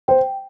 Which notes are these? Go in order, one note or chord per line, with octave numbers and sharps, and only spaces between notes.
C5 G5